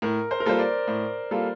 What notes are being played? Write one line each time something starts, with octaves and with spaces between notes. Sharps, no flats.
A2 A#4
C5
A#4
G3 A#3 F4 A4 C5
D5
A2
G3 A#3 F4 A4